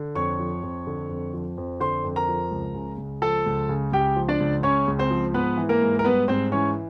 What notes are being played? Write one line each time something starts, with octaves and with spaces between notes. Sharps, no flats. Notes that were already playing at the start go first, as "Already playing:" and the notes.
Already playing: D3
F2 C#5 C#6
F3
F2
D3
F2
F3
F2
D3 C5 C6
F2
A#4 A#5
F3
C#2
C#3
C#2
F3 A4 A5
C#2
C#3
C#2 G4 G5
F3
D4 D5
C#2
C#3 C#4 C#5
C#2
C4 C5
F3
G#2 B3 B4
E3
A#3 A#4
G#2
A#4
G3 B3 B4
G#2 C4 C5
E3 C#4 C#5